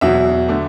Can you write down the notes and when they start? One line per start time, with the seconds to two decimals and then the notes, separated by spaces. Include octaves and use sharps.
0.01 E2 B2 F#3 E5
0.48 D3 A3